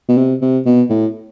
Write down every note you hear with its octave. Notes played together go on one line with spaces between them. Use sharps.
B2
C3
C3
B2
A2